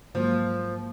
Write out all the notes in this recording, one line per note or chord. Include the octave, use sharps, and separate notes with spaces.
G#2 F3 F#3 A#3